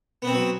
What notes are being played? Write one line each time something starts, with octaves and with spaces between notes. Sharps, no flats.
F#3 B3 C4